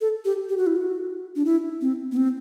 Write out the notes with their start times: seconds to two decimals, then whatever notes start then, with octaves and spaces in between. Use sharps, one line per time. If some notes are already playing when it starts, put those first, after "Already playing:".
0.01 A4
0.25 G4
0.49 G4
0.57 F#4
0.67 E4
0.76 F#4
1.36 D4
1.45 E4
1.81 C4
2.12 B3
2.17 C4